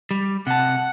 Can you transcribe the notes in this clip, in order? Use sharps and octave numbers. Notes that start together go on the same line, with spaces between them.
G3
C3 F#5 A5